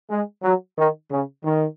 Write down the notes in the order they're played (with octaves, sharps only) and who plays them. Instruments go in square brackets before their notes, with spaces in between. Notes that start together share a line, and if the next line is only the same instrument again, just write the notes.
[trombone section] G#3
F#3
D#3
C#3
D#3